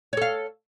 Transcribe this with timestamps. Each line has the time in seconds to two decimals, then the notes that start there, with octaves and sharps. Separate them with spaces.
0.13 C#5
0.17 A4
0.22 F5